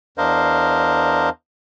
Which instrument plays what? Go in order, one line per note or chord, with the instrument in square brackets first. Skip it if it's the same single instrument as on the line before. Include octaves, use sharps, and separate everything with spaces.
[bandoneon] E2 D4 A#4 C5 D#5 F5